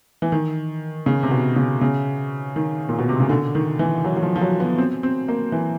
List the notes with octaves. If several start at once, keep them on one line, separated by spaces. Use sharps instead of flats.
E3
D#3
C#3
C3
B2
C#3
C#3
D#3
A#2
B2
C3
C#3
D3
D#3
E3
F#3
F#3
F3
F3
F#3
B3
C4
C4
A#3
E3